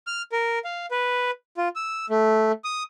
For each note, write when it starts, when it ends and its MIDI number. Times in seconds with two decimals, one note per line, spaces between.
0.07 0.22 89
0.32 0.59 70
0.64 0.86 77
0.91 1.31 71
1.57 1.68 65
1.76 2.06 88
2.10 2.52 57
2.64 2.83 87